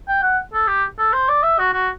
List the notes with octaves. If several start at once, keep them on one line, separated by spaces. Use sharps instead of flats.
G5
F#5
A4
G4
A4
C5
D5
E5
F#4
F#4